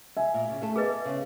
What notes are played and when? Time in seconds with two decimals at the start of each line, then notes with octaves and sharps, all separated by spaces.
0.17 E5 G#5
0.34 A#2
0.48 C#3
0.61 A3 A4
0.76 B3 G#4 B4 D#5
1.05 C#3